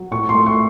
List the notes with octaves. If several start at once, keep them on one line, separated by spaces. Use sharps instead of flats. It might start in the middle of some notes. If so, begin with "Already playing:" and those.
Already playing: F#3
A2 C#6
C6
A3
C#6